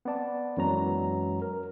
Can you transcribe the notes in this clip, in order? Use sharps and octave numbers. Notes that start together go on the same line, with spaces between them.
B3 C4 D5 A5
F#2 E3 F#3 G#3 A#5
A#4